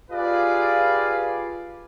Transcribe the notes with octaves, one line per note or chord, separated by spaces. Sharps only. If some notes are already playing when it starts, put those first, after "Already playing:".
F4 G4 G#4 B4 D5 F5